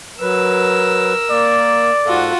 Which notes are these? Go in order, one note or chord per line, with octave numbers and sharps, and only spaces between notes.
F#3 A#4 B4 E6
A#3 D5
G#2 F4 F#4 A4 F#5